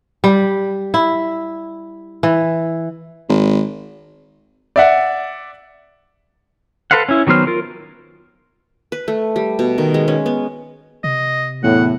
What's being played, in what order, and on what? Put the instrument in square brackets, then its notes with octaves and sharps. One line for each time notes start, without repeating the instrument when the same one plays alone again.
[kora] G3
E4
E3
[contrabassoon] G#1
[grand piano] D5 E5 F#5
[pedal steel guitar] A4 B4 C5 F5 F#5
C#4 E4
D#3 F#3 B3 C5 F6
F4 A#4
[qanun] B4
A3
G3
B2
D#3
G#3
C#4
B3
[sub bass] C3 [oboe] D#5
[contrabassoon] E2 [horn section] A2 [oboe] F#5